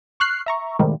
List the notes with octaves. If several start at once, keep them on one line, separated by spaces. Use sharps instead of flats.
C#6 F6 F#6 C7
E5 A#5 C#6
A2 C3 D#3 G3 G#3 A#3